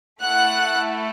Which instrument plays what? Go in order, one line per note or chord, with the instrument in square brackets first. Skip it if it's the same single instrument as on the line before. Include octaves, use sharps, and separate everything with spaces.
[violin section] A3 E4 A4 F#5 F#6